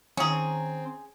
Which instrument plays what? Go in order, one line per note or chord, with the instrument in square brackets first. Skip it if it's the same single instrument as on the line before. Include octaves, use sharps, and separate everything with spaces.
[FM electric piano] D#3 A#5 [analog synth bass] C4 [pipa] C#4 G#4